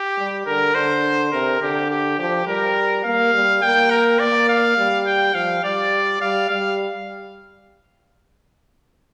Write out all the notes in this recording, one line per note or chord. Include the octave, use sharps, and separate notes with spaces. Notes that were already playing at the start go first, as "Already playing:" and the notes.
Already playing: G4
G3
D3 A#4
D3 C5
C3 A#4
D3 G4
G4
F3 G4
G3 A#4
A#3 F5
G3
A#3 G5
A#4
A#3 D5
F5
G3
G5
F3 F5
G3 D5
G3 F5
G3 F5